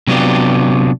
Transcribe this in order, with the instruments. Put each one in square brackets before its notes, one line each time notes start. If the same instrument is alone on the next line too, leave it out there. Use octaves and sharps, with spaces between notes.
[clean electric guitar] C3 F#3 B3 D4 F4 G4